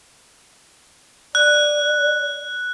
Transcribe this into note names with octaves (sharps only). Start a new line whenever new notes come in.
D5 F#6